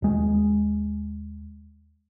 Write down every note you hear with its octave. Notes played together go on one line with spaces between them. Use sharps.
D#2 G#3